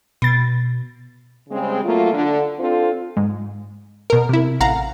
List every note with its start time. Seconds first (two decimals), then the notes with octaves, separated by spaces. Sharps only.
0.22 B2 A6
1.50 C#3 G3 G#3 C4
1.83 F#3 A3 A#3 F4
2.12 D3
2.59 C4 D4 F4 A4 C5
3.17 G#2
4.10 B2 A#4
4.29 C3 E4
4.60 A1 A2 F5 F#5 A#5